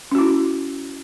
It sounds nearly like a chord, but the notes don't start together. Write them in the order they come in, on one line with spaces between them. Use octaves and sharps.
C#4 F#4 E4